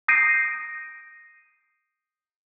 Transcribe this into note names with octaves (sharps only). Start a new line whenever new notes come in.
D#6 G6 A#6 C7 D7 D#7